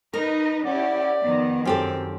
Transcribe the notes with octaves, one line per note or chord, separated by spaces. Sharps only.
D#4 A#4 B4 D#5
C#4 E4 G4 D5 F#5
F2 D#3 B3
F#2 F#3 C4 G4 A4